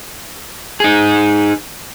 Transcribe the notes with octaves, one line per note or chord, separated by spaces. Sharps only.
D#4 G#4